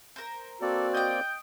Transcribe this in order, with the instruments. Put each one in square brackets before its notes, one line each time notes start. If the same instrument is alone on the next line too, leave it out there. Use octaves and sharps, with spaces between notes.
[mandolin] A#4 C5
[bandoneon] A#3 C4 D5 [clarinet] F#4 [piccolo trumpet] A4
[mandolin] D#5 G5 [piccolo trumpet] G6